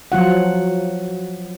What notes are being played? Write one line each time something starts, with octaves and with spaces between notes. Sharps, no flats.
F3 F#3 F4 F#5